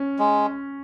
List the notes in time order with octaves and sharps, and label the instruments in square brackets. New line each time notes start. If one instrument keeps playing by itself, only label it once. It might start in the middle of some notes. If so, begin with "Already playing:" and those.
Already playing: [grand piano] C#4
[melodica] G#3